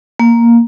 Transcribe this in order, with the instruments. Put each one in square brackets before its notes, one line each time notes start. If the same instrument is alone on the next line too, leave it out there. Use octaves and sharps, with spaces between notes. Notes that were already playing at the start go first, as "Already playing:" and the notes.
[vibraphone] A#3